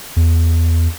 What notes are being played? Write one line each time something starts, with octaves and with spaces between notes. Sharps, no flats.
E2